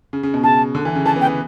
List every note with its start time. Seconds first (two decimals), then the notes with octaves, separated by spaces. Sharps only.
0.13 C#3
0.23 C#3
0.34 B2
0.44 C#3 A5
0.75 D3
0.85 E3
0.95 C#3
1.06 E3 A5
1.16 B3
1.21 G5
1.26 B3